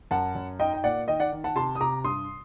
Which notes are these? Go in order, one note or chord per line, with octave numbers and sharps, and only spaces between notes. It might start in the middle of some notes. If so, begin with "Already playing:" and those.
F#2 F#5 A5
F#2
D#4 D#5 G5
G5
A#2 D5 F#5
D#3 D#5 G5
D5 F#5
D#3
F#5 A5
C3 A5 C6
D#6
C3 A#5 D6
G2 C6 D#6